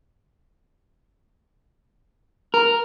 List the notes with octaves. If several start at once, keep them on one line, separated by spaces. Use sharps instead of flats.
A#4